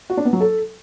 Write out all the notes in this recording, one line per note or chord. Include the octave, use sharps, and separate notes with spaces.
F#4
D4
B3
F#3
A4